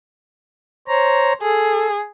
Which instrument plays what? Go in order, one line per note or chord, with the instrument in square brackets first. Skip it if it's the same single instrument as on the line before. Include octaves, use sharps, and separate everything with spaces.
[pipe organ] C5 C#5 A#5
[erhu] G#4 [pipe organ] A4